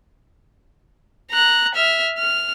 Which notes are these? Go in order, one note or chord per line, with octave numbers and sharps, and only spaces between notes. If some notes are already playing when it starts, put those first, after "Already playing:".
A#5 F#6
E5 F6
F6